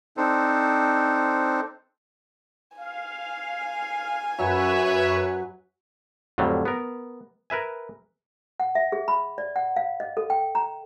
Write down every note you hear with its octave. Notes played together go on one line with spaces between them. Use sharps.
C4 D4 D#4 A4 C5
F5 G#5
F#2 F#3 B4 C#5 E5
F2 A2 D3 F#3 G3
B3 A#4
A#4 B4 E5 G#5
F#5
E5
G#4
B5
D5
F#5
F5
D#5
A4
G5
A#5